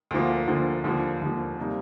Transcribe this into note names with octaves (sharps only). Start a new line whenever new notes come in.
D2 D3 F3 A#3
D2 D3 F3 A#3
D#2 D3 F3 A#3
D#2 D3 F3 A#3
C3 G3 A#3 D#4